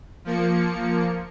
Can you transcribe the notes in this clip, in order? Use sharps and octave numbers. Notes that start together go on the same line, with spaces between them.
F3 A#3 C#7